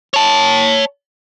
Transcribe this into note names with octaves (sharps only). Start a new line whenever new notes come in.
C#5 A5